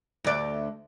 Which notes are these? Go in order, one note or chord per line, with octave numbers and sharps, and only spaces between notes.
D2 D5